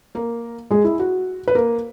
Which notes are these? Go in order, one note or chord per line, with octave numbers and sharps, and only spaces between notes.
A#3 A#4
G#3 G#4
E4
F#4
B4
A#3 A#4